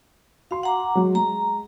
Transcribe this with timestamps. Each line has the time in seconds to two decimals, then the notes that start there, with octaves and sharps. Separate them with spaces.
0.51 F#4 F5 C6
0.63 F#5 A#5 D6
0.95 F#3 G#3 F#4
1.15 G#3 A#5